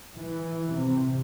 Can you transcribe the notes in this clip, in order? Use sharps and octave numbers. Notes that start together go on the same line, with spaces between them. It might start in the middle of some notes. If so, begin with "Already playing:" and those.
E3
C3